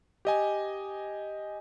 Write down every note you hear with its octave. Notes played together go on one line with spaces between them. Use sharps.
G4 D#5 G#5